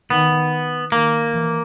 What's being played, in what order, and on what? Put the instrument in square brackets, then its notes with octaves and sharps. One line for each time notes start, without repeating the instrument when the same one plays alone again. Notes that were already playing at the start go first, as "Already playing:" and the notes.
[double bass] D#3 [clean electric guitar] B3
[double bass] D#3 [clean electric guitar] A#3
[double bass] E3